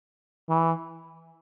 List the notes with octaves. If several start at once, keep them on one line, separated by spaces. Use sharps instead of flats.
E3